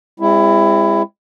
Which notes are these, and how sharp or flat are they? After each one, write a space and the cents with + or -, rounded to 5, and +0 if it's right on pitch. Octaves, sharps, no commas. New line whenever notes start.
G#3 -40 C4 +0 E4 +15